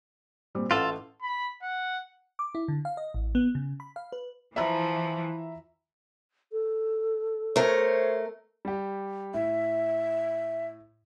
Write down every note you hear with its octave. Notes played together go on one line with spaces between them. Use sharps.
A#2 G3 C4
A1 A3 F4 A4 F#5
B5
F#5
D6
E4
D3
F5
D#5
A1
B3
C#3
B5
F5
B4
E3 F3 E5 A#5 B5
A4
A3 A#4 C5 C#5
G3 G4
A2 E5